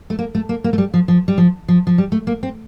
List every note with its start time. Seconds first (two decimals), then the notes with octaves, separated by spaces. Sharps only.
0.10 A3
0.19 A#3
0.35 A3
0.49 A#3
0.64 A#3
0.73 A3
0.78 G3
0.94 F3
1.08 F3
1.28 G3
1.38 F3
1.68 F3
1.87 F3
1.98 G3
2.12 A3
2.27 A#3
2.43 C4